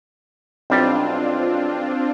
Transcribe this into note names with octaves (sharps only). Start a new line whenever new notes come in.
B1 G3 C4 D4 F4